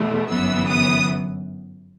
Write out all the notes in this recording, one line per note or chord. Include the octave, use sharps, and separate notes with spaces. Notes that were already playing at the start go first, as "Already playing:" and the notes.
Already playing: E2 B2 A3
G1 F#2 E3 B3 E6
D#6